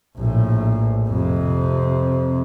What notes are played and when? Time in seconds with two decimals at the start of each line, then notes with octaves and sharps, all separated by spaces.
0.18 A#1 A2
1.08 F2 C3